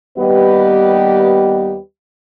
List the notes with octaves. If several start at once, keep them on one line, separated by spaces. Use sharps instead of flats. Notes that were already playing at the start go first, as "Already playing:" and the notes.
D#2 G3 B3 G4 B4 D#5